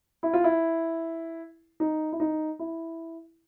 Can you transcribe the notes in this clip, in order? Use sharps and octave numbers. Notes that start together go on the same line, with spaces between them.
E4
F4
E4
D#4
E4
D#4
E4